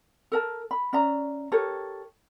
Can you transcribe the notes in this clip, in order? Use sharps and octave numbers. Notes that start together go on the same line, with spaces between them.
A4 A#4 A5
B5
C#4 D5 E5 A#5
G4 A4 A#4 C#5